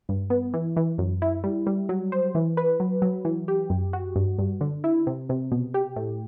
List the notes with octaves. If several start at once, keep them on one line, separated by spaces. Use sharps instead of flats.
G2
B3
E3
E3
F#2
E4
G3
G3
F#3
C5
E3
B4
F#3
F#3
E3
G4
F#2
F#4
G2
G2
D3
E4
C3
C3
B2
G4
A2